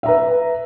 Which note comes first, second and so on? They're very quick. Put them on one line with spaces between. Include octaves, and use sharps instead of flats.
E5 A#5 B4